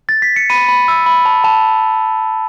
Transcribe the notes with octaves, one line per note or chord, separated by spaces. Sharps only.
A6
B6
C#7
B5 D#7
B5
E6
B5
A5
A5